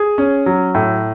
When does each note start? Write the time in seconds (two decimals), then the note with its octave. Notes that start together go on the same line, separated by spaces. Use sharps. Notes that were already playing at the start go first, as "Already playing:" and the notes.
Already playing: G#4
0.18 C#4
0.46 F#3
0.75 A2